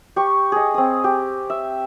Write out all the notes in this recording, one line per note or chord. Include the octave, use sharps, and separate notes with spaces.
G4 C#6
G#4 D#5
C4 D#6
G4
E5